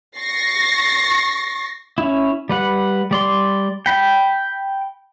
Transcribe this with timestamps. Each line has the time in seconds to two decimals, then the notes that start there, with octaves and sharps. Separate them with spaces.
0.18 C#6 A6 A#6 C7
1.98 C#4 E4
2.49 G3 B4 F#5
3.11 G3 D5 C6
3.86 G5 B5